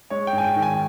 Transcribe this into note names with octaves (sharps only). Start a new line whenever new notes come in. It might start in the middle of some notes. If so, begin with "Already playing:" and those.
G#3 C#5
G5
G#2 G#5
G5
D#3
G#5